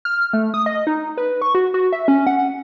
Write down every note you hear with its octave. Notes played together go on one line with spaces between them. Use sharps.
F6
A3
D#6
D#5
D#4
B4
C#6
F#4
F#4
E5
C#4
F#5